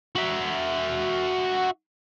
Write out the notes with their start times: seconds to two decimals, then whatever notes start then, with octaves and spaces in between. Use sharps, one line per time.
0.15 F#4 E5